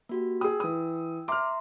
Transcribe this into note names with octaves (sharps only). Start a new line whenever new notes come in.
A#3 F#4 G4
G#4 G5 D#6 E6
E3 D#6
E5 A#5 C6 D6 F6